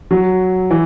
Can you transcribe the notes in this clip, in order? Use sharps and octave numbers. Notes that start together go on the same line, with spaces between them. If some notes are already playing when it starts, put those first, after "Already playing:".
F#3
E3